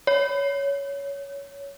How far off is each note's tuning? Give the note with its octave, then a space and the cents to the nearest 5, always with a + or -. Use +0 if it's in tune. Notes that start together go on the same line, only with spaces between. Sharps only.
C#5 +15